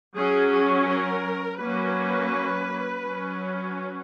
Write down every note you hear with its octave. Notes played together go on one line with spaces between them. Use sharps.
F#3 C#4 G#4
G#4
A#4
F#3 A#3 C#4 B4
F#3 C#4